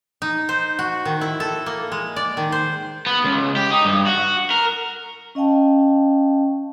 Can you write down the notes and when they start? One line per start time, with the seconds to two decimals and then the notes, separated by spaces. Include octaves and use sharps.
0.22 D#4
0.49 C5
0.79 F#4
1.05 D#3
1.21 E4
1.40 A4
1.66 A#3
1.92 G#3
2.16 D5
2.37 D#3
2.52 C5
3.06 B3
3.24 C#2
3.57 G4
3.71 D#4
3.85 G2
4.06 F#4
4.51 A#4
5.35 C#4 D#5 F5 G5 A5